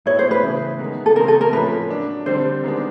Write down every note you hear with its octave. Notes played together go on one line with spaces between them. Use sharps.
A2 F#3 B3 E4 C#5
C5
B4
C#3 E3 A3
D#3 G#3 B3
A4
C#3 E3 A3 C4 A#4
A4
A#4
A2 F3 A#3 C#4 B4
F#3 A#3 D4
D3 G3 C4 C5
D#3 G#3 B3 D4